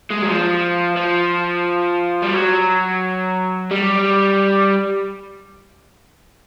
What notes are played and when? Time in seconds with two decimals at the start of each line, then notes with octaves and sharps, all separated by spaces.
0.11 G#3
0.23 F#3
0.29 F3
0.97 F3
2.22 G3
2.34 F#3
3.71 G3